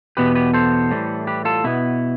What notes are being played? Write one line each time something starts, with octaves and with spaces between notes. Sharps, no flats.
E2 B2 B3 G4 B4
G4 B4
A4 C5
A2 E3 G3
G4 B4
F4 A4
B2 B3 E4